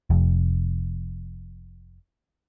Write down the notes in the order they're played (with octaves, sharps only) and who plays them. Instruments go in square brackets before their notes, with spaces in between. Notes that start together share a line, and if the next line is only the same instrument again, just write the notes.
[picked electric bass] F1 F2